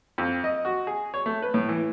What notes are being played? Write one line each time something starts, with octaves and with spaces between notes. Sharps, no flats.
F2
D#5
F#4
G#4
C#5
A3
B4
A2
E3